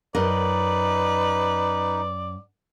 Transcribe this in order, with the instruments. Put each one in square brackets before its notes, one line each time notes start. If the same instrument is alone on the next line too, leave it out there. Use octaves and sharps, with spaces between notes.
[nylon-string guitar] F#2 A#4 D#5 [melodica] D#4 [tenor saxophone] B4 [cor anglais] D5